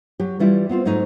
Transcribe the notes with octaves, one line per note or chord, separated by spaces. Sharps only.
F#3 G4
E3 G3 E4 F4 G4
B3 C4 F4 C5
G#2 F#3 A3 D#4